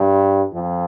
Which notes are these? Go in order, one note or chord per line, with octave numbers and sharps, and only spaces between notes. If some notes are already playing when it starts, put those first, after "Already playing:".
Already playing: G2
F2